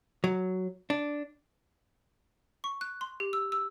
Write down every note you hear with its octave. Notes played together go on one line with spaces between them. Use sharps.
F#3
D4
C#6
F#6
C6
G4
E6
E6